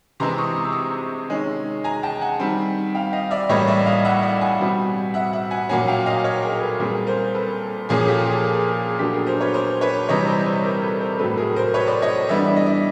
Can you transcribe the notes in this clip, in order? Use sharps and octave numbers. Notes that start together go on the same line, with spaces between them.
C3 E3 G#3 C4 A#5 C6
C#6 D#6
D#6
E6
C#6 D#6
D#3 G#3 C#4
G#5 A#5
G5 A5
F#5 G#5
D#3 G3 C4
F5 G5
D#5 F5
D5 E5
A2 E3 G3 A#3 C#4 C#5 D#5
D5 E5
D#5 F5
E5 F#5
D5 E5
F#5 G#5
B2 G3 C4
E5 F#5
E5 F#5
F#5 G#5
A#2 F#3 A#3 C#4 F#5 G#5
F5 G5
D#5 F5
C#5 D#5
G#4 A#4
A4 B4
A#2 G3 C4 G#4 A#4
A#4 C5
A4 B4
A#2 F3 A#3 C#4 G#4
G4 A4
G#4 A#4
G#4
G#4
G#4
G#4
A#2 F#3 B3 D4 G4 A4
G#4 A#4
A#4 C5
B4 C#5
A#4 C5
B4 C#5
C3 E3 G3 C#5 D#5
C5 D5
B4 C#5
A#4 C5
A4 B4
A#4 C5
A2 F#3 A3 A4 B4
G#4 A#4
A#4 C5
B4 C#5
C5 D5
C#5 D#5
E3 G3 B3 D4 D5 E5
D5 E5
D#5
D5 E5